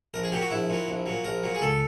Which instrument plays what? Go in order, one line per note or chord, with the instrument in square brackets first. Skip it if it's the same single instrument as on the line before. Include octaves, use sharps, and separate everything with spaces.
[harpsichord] A#1 A#4
G#4
A#2 F#3 G4
F#4
A#1 E4
A#2 F#3
A#1
A#2 F#3
A#1 A#4
A#2 F#3
G#4
C#2 A4